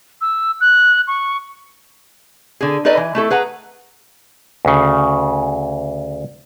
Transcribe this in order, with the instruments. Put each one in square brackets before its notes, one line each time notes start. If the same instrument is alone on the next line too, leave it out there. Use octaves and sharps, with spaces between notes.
[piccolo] E6
F#6
C#6
[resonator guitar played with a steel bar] D3 G#4
D#4 A4 B4 D5 D#5
E3
A3 E4 A4
G#4 B4 F#5 A#5
[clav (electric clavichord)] D2 C#3